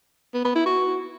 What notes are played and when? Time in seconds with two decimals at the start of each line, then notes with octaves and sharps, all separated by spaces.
0.34 B3
0.45 B3
0.55 E4
0.66 F#4